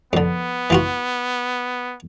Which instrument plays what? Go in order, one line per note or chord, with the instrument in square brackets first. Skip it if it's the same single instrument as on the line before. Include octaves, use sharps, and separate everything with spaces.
[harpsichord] F2 D3 [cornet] B3
[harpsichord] E3 F4 F#4